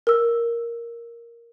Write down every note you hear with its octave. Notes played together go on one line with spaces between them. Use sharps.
A#4 E6